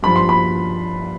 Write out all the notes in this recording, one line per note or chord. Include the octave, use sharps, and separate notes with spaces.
G2 F3 B5
C6
B5